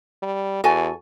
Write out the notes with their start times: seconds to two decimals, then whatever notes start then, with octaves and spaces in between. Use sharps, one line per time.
0.22 G3
0.64 E2 F#4 A4 G#5